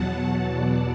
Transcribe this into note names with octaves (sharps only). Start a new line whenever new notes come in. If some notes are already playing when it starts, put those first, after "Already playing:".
Already playing: E2 B2 F#3 F#5 A5
D5